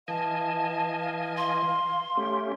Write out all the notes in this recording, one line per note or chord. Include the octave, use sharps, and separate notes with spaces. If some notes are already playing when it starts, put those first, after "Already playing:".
E3 D#5 F5 G#5 A5
F5
C6
A3 C#4 G4